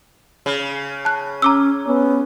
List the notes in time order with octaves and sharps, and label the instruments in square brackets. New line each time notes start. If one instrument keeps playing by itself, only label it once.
[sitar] C#3
[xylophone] A5 F#6
[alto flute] C#4 [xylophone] A#5 D6 E6
[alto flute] B3 [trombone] C#4